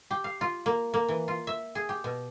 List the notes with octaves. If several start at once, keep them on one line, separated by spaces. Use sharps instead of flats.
G4
F5
F4
A#3
A#3
E3
F4
E5
G#4
G4
B2